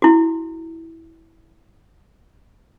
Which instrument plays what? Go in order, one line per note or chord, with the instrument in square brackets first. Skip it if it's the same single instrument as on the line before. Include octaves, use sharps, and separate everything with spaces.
[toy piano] E4 F#4